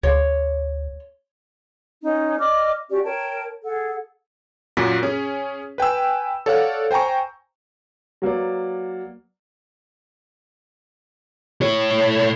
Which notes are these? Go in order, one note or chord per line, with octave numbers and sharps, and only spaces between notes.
D2 C#5
C#4 D#4
D5 D#5 D6 F6
C#4 F#4 G4 D5
A#4 C#5 G5 A5
G#4 A4 F#5
F#2 A#2 F#4 B6
C#4 G#4
B4 G5 G#5 E6
A4 C#5 D5 F5 F#5
C5 G5 G#5 A#5 C#6
F#3 A#3 B4 D5
A2 C#5